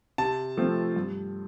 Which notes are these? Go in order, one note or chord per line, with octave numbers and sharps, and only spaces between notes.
C3 A5
F3 A3 C4
G2